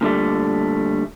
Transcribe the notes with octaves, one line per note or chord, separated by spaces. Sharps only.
A#2 D3 G3 A3